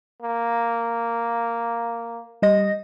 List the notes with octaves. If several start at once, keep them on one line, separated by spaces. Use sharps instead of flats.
A#3
G3 D#5 A#6